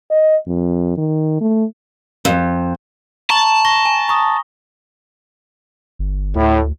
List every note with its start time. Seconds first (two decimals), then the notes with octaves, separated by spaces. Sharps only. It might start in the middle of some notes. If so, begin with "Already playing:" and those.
0.11 D#5
0.47 F2
0.97 D#3
1.41 A3
2.25 F2
3.30 A5 A#5 C#6 F#7
3.65 C#6 A#6 G7
3.86 G#5
4.08 A#5 C#6 D#6
5.99 G1
6.35 D2 A2